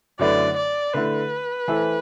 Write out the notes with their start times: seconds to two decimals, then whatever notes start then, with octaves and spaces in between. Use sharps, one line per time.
0.19 F#2 D3 A3 E4 B4 D5
0.57 D5
0.94 D3 A3 E4 B4
1.68 E3 A3 E4 A4 C5